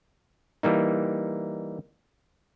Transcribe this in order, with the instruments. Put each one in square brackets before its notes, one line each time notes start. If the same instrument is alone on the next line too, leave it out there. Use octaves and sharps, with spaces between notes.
[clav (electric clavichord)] E3 G3 A#3 D#4